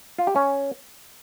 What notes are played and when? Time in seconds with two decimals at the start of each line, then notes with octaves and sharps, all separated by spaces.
0.18 F4
0.27 G4
0.36 C#4